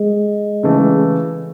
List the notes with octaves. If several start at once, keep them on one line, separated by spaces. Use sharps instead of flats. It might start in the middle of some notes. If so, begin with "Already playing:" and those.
Already playing: G#3
C#3 E3 A3